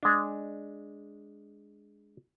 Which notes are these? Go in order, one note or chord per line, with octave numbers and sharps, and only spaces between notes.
G#3 D4